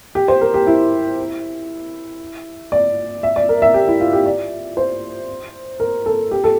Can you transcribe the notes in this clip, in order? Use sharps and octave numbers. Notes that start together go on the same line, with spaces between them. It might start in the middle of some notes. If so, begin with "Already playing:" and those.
G4
C5
A#4
G4
E4
D5
E5
D5
A#4
E5
G4
E4
F4
G4
D5
C5
A#4
A4
G4
A4